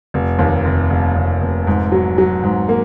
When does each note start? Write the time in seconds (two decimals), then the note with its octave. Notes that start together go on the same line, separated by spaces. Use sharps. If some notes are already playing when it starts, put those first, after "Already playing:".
0.14 F1
0.39 D#2
0.65 F1
0.90 F1
1.16 F1
1.41 F1
1.67 G#2
1.92 F#3
2.18 F#3
2.43 G#2
2.69 A#3